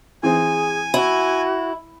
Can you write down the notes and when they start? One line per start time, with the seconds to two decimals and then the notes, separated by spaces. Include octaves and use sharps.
0.23 E3 C4 G#4 G#5
0.94 E4 F#4